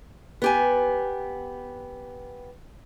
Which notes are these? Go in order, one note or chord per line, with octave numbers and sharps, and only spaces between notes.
B3 G4 G#5